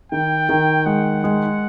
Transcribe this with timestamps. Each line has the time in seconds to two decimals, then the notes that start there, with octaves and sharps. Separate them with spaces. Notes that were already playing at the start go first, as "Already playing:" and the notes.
0.11 D#3 G5
0.49 D#3
0.86 G#3 F#5
1.24 G#3